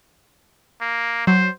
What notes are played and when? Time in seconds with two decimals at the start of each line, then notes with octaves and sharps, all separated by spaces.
0.81 A#3
1.27 F#3 C5